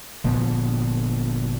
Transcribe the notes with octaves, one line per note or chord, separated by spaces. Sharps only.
G1 A#2 F3 B3